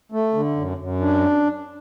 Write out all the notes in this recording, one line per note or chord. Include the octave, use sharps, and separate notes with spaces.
A3
D3
F#2
F#2
D4